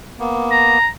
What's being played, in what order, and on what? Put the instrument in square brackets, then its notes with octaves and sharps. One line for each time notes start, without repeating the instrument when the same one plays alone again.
[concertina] A#3 B3
[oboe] A#5